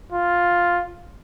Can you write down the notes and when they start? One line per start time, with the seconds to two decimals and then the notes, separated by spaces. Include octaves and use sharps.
0.12 F4